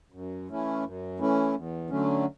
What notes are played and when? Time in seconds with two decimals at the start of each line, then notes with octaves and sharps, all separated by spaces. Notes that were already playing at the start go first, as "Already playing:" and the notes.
0.12 F#2
0.48 E3 A3 C#4 E4
0.84 F#2
1.19 E3 A3 C#4 E4
1.55 E2
1.90 D3 F#3 A3 C#4